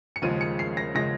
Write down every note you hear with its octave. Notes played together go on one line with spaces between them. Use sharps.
C#7
D#2 C#3 F3 G#3 D#7
C#7
C7
A#6
C#3 F3 G#3 A#6